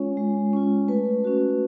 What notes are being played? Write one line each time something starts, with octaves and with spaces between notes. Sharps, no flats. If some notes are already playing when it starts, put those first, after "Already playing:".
Already playing: G#3 C#4 F4 C#5
G#3
C#4 F4
A3 B4
C#4 F#4